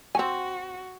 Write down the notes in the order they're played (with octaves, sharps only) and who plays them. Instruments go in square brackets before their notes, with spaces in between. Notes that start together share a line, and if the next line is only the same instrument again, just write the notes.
[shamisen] C4 G#5 [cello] F#4